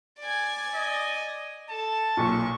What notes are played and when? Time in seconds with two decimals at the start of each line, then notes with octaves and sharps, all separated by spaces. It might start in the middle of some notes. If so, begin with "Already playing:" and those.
0.20 D5 G#5
0.75 D#5
1.69 A4 A5
2.17 B1 A#2 C#6